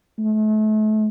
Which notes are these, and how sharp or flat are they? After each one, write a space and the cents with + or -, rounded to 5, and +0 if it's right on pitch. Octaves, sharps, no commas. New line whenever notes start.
A3 -35